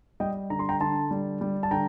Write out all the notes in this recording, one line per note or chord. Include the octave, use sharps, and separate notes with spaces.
G3 D#5 G5
D3 A#5
C6
G5 A#5
D3 A5 C6
G3
G3
A5
D3 G5 A#5